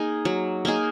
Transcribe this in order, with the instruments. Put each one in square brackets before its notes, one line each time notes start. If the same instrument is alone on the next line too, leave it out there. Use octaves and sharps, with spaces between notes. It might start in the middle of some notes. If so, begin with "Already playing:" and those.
Already playing: [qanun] A#3 D#4 G#4
F#3
A#3 D#4 G#4